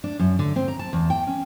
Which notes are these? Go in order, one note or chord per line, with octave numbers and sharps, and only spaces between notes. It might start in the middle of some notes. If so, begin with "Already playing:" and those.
D4
F#2
D3
C4
A#5
A5
E2
G5
C#4